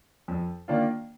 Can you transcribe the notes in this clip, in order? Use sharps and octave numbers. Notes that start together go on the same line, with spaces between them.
F2
D#3 A#3 D4 F4